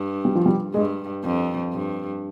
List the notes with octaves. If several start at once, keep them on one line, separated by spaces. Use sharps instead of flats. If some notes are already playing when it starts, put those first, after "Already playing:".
Already playing: G2
G3
F3
G3
G2 G#3
F2
G2